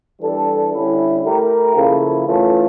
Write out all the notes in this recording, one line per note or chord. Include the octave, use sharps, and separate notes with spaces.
E3 G3 D4 A4
D3 G3 C#4 E4
A3 E4 G4 A#4
C#3 F3 A#3 E4 A4
E3 A3 C#4 F4 A4